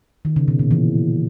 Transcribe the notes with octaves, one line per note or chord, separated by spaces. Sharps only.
D#3
C#3
B2
A#2
E3